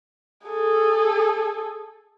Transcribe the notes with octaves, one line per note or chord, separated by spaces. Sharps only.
G#4 A4